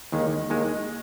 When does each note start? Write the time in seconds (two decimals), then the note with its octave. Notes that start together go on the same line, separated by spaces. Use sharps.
0.12 D#2 D#3 G#3
0.50 D#2 D#3 G#3